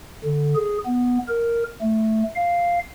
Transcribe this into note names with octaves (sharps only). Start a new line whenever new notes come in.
D3
G#4
B3
A#4
A3
F5